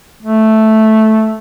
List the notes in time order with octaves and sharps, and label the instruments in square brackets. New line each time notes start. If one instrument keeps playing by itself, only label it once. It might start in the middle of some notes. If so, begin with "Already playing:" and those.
[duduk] A3